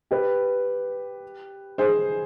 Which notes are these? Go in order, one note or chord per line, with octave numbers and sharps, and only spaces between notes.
G4 B4
G#4 C5